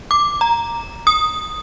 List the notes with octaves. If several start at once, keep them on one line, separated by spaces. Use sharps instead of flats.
D6
A#5
D#6